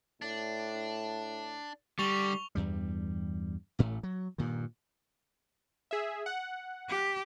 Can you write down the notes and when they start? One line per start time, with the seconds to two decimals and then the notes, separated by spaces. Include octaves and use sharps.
0.22 A2 D4
1.99 D3 G3 C#6 F7 G7
2.55 E2 G2 G3
3.79 A1 A2 A3
4.03 F#3
4.38 G2 A#2 D#3
5.91 G#4 E5
6.26 F#5
6.89 G4